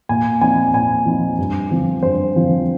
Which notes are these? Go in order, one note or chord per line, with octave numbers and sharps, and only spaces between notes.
A#2 G#5
F3 C4 D#4 G#5
A#2 G#5
F3 C4 D#4
G2
D3 F3 C4
G2 C5
D3 F3 C4